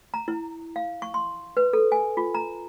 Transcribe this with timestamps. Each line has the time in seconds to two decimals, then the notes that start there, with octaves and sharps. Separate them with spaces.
0.14 A#5
0.28 E4
0.76 F5
1.02 C#6
1.14 C6
1.57 B4
1.73 A4
1.92 G#5
2.17 F4
2.35 A#5